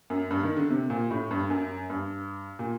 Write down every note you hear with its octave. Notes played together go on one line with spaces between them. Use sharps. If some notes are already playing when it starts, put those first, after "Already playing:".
F#2
G2
D#3
D3
C3
A#2
A2
G2
F#2
G2
A#2